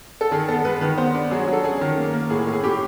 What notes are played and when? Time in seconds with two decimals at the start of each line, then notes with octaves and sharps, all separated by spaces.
0.21 A4
0.32 D#3 G#4
0.48 B3 A4
0.65 G#3 B4
0.81 D#3 B4
0.98 B3 C5
1.14 D4
1.31 F#3 G#4
1.47 F#3
1.53 A4
1.64 C#4 G#4
1.81 D#3
1.97 A#3
2.13 A#3
2.30 A2 G#4
2.47 A2
2.53 G#4
2.63 A2 G4